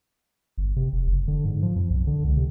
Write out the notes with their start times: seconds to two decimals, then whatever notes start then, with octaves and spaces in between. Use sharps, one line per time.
0.58 G1
0.76 C3
0.93 F1
1.07 F#1
1.28 D3
1.45 G#2
1.62 F3
1.76 F2
1.90 B1
2.07 D3
2.24 C#2
2.37 C3